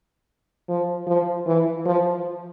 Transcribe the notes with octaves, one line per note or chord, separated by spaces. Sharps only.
F3
F3
E3
F3